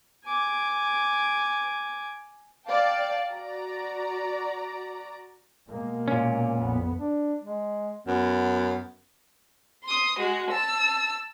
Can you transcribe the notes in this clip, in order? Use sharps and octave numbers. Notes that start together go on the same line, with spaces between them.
G#5 D6
D5 F5 G5 A5
F#4 D5 A#5
B2 G#3 A#3
A#2 C#4
A#1 F2 B3
D4
G#3
F#2 B3
C6 D#6
G#3 F#4
A5 E6